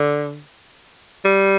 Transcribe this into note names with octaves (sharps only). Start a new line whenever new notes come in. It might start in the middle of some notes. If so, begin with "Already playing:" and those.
Already playing: D3
G3